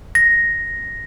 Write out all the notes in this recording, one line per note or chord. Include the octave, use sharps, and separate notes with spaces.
A#6